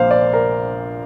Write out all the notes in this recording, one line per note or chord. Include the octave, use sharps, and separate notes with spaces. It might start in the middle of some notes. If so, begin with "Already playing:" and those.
Already playing: A#1 A#2 A#3 C5 F5
D5
A#4